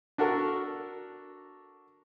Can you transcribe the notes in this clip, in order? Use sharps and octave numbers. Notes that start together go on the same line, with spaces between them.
D4 F#4 A4 A#4